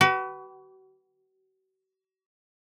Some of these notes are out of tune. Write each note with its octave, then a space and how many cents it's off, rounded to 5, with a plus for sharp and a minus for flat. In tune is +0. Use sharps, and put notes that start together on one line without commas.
F#4 +40 B4 +0